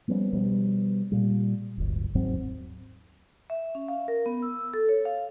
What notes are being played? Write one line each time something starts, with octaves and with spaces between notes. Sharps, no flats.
F3 G3 B3 C#4
B2 F3 G3 B3
A#2 G3
D1 G1
D#2 G#2 F#3 C4
E5
C#4
F5
A#4
B3
E6
A4
C#5
F5